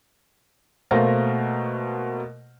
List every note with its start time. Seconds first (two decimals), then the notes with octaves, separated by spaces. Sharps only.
0.91 B2 A3 A#3 A#4 C5 A#6